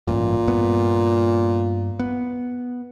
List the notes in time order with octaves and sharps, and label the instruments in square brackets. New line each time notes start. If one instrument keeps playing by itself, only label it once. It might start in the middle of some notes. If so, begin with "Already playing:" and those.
[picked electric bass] A1 G2 [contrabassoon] A#2
[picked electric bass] G2 B3
B3